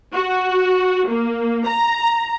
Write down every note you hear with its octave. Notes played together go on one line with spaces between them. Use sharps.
F#4
A#3
A#5